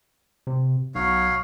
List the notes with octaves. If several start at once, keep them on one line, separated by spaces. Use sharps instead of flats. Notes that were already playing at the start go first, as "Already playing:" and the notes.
C3
B1 F#3 C#5 F5